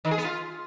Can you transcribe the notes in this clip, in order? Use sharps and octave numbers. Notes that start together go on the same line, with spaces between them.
D#3
G#4
B3
F4